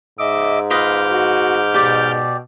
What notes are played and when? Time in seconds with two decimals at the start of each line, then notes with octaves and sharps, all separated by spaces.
0.19 G#2 D#5 E5 D6
0.71 F4 B4 D#5 D6 F6 G6
1.09 F#4
1.74 B2 G4 D5